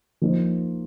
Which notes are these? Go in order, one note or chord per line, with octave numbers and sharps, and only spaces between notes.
F3 A#3 D#4 C5